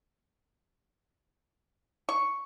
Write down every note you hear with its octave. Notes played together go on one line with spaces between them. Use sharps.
C#6